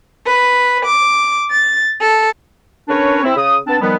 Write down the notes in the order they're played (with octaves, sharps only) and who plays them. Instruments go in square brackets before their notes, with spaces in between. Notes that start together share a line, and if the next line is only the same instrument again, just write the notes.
[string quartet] B4
D6
A6
A4
[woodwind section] C#4 D4 A#4 B4 C#5
C4 E4
C#3 D#6
B3 C4 D4 A5
D#3 F3 G3 B3